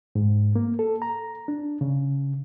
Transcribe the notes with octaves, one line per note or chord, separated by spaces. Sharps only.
G#2
A#3
A4
A#5
D4
C#3